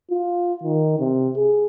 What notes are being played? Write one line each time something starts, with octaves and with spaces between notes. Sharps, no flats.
F4
D#3
C3
G#4